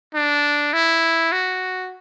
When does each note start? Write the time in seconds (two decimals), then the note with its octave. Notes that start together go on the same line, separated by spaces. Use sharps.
0.15 D4
0.73 E4
1.32 F#4